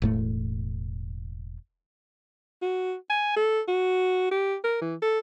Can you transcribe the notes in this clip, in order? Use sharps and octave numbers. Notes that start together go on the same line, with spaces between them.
E1 A2 A3
F#4
G#5
A4
F#4
G4
A#4
E3
A4